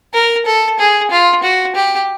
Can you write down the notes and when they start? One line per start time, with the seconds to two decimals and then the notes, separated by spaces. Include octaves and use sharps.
0.14 A#4
0.46 A4
0.79 G#4
1.11 F4
1.43 F#4
1.75 G4